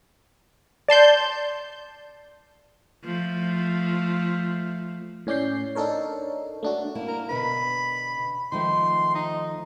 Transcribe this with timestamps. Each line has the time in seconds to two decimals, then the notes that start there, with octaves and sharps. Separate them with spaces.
0.88 D5 A5 C6 G6
3.04 F3 A3
5.27 A2 C#4 D5 G6 C7
5.75 D4 D#4 A4 A#4 C#5
6.63 A3 D4 F#4
6.95 A#3 E4
7.08 A#4
7.29 B2 D3 B4 B5
8.52 D#3 F3 A3 C6
9.15 D#4